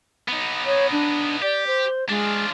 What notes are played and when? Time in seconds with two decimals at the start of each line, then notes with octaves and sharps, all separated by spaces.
0.28 B3 D#4
0.66 C#5
0.92 D4
1.42 G4 D5
1.67 C5
2.09 G#3 D4 F4